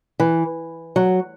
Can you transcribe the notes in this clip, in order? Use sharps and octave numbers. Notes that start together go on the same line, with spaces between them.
E3
F#3